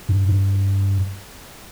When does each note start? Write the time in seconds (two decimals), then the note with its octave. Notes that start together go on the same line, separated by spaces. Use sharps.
0.09 G2
0.28 G2